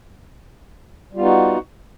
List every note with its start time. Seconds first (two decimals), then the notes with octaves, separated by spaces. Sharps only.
1.13 G3
1.16 F4
1.19 B3
1.22 D#4
1.25 F#4